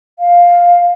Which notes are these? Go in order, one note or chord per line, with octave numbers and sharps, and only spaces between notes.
F5